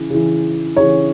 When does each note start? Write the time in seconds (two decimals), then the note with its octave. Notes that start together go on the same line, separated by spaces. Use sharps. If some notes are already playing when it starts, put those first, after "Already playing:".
Already playing: C#3 E3
0.10 C#3 E3
0.77 C#3 E3 C#5